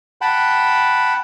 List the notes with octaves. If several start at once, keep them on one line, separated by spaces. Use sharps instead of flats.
F#5 G5 A5 B5